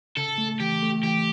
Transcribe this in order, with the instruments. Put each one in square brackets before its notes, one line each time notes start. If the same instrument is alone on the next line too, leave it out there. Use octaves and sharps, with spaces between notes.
[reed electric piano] C#3 [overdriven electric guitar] A4
[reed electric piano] A3
[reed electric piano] E3 [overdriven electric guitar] G4
[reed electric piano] A3
[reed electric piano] E3 [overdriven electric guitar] G4